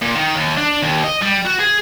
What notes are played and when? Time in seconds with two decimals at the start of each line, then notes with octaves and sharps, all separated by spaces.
0.02 A#2
0.15 D#3
0.35 D#2
0.57 D4
0.83 D#2
1.04 D#5
1.22 G3
1.45 F#4
1.59 G#4